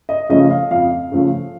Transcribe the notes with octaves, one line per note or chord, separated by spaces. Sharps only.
D#5
C#3 F3 A3 D#5
F5
F2 F5
C#3 F3 A3